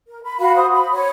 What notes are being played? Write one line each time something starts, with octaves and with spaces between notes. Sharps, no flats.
A#4
B5
F#4 F5 B5
C5 D#6
B5
C#5